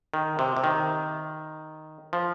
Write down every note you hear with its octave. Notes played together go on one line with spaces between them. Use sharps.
D#3
C3
C3
D#3
F3